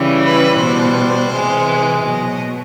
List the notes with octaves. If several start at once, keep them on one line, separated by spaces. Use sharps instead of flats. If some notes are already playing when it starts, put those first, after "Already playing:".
Already playing: C#3 E3 G3
B4
B2 G3 C5
C3 E3 G#3
B2 F#3 D#5